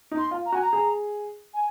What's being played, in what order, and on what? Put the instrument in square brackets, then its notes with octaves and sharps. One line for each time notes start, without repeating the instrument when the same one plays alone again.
[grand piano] D#4
[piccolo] C6
[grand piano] F4
[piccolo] A#5
[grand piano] F#4 [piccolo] G#5
[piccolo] A#5
[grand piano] G#4
[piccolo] G#5